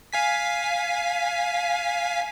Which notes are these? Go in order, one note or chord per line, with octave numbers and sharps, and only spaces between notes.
F5 G#5 B6